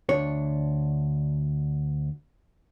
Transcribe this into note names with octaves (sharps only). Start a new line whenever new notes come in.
D2 D4 C#5